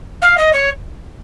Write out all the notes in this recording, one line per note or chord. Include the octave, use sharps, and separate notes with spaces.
F5
D#5
C#5